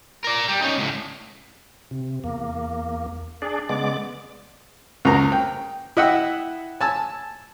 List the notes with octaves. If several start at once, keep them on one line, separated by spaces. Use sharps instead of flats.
A#4 D5
G3
C#4 D#4
C#2 A2
C3
E2 A#3
D4 G#4 D5
C#3 G#3 B3 D5 D6
C#2 F#2 A#5
G5
E4 D#5 F#5 G5 E6
G#5 A5 E6